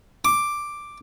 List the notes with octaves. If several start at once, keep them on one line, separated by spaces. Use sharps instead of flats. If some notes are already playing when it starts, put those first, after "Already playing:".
D6